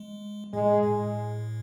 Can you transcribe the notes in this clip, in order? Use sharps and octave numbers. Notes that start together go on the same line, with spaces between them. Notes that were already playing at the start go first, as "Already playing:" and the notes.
Already playing: G#3
A2 G#3
A2